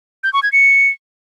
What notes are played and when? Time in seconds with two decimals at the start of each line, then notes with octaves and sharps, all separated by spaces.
0.24 G6
0.33 C#6
0.43 G#6
0.52 C#7